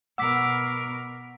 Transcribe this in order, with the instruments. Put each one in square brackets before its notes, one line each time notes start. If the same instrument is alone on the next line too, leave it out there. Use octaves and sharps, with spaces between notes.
[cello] B2 A#4 [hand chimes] F#5 B6 [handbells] D6 E6